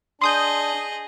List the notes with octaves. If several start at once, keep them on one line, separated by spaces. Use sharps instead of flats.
D4 G#4 D#5 C6 D#6 G6